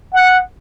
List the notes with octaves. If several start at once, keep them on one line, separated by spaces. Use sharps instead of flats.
F#5